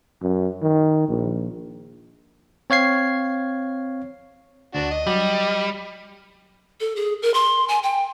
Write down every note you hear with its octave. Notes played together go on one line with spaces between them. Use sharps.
F#2
D#3
A#1
C4 C#5 F5 G#6 C7
D2 D4 F#4
D#5
F#3 G3
A4
G#4
A#4
C6
G#5
G5